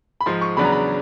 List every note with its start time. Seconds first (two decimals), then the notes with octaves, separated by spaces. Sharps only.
0.21 B5
0.26 G#2 F3 G#3 C6
0.41 C#6
0.57 E2 C#3 F#3 B3 D4 B5
0.65 A#5
0.72 B5